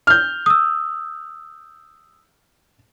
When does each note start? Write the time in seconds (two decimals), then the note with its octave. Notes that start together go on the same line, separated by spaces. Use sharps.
0.07 F6 G6
0.46 D#6 E6